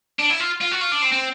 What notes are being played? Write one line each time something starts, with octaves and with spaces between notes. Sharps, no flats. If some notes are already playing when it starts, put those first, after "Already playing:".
D4
E4
F4
F4
F#4
F4
D4
C4
C4